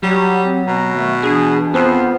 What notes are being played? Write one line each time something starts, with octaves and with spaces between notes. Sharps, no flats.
F#3 G3
C4
B2 A#5
D#3 A3
E3 D4 G#4
F2 B3 C5